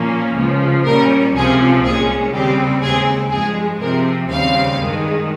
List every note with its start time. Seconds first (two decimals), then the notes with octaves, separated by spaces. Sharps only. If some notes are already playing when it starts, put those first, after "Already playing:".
Already playing: A#2 F3 A#3 C#4
0.37 C#2 C#3 F3
0.86 A#2 G3 C#4 A#4
1.35 C#2 C3 F3 C4 G#4
1.84 C2 A#2 G#3 C#4 G#4
2.33 D#2 C#3 G3 C4 G4
2.82 D#2 C#3 G#3 C4 G#4
3.32 G2 F3 G#3 G#4
3.81 C3 F3 C4 A#4
4.29 D#2 C#3 G3 C4 F5
4.79 G2 D#3 G#3